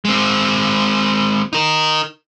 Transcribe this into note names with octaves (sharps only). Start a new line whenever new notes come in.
G#3 C4
D#4 A#4